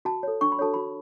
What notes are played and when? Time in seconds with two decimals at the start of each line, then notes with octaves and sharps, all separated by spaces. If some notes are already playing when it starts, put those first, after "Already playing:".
0.05 F#4 A5
0.23 A4 C#5
0.41 D4 C#6
0.52 B5
0.59 F#4 A4 C#5 A5
0.74 F#4 B5